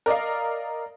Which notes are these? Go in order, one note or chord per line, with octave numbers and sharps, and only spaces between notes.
A#4 D5 D#5 F5